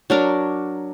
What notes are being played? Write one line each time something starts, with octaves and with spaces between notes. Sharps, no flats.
F#3 D4 A#4